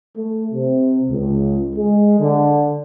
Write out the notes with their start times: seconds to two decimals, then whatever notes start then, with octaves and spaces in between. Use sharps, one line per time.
0.16 A3
0.53 C3
1.10 C#2
1.76 G#3
2.19 D3